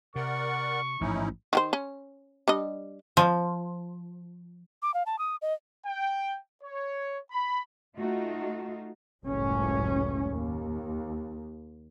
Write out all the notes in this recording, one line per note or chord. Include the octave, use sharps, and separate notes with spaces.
C3 A#4 D5 F#5 C#6
A1 G#2 F3 C#4 D#4 E4
D#3 G4 C5
C#4
G3 D4 D#5
F3
D6
F5
A5
D#6
D#5
G5
C#5
B5
A3 D#4 F4 F#4
F#1 C#2 A2 C#4
D#2